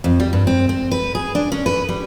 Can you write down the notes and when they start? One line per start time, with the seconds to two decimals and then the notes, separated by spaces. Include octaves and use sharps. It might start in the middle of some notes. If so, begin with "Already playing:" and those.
0.04 F2
0.20 G3
0.33 G2
0.47 C4
0.69 C4
0.91 B4
1.15 G#4
1.35 D4
1.52 C#4
1.66 B4
1.89 G3